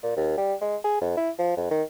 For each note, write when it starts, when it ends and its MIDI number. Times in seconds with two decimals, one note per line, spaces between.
0.03 0.15 46
0.16 0.35 39
0.38 0.54 55
0.61 0.76 56
0.84 0.98 68
1.01 1.13 41
1.17 1.30 64
1.38 1.56 53
1.57 1.70 41
1.70 1.83 51